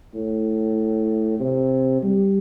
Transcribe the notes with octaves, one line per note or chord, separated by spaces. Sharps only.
A2
C3
G3